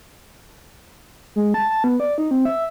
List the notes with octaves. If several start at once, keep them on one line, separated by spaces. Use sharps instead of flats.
G#3
A5
A5
B3
D5
D#4
C4
E5